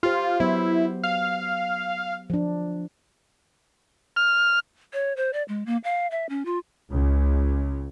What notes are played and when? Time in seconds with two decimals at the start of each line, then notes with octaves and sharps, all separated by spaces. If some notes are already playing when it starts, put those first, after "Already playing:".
0.03 F4 G4 C5
0.40 F#3 B3 E4 C5
1.03 F5
2.30 F3 D4
4.16 F6
4.93 C#5
5.17 C5
5.33 D5
5.48 G#3
5.66 A#3
5.84 F5
6.11 E5
6.29 C#4
6.45 F4
6.91 C#2